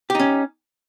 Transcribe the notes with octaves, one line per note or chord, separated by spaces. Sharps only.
C#4 D#4 G4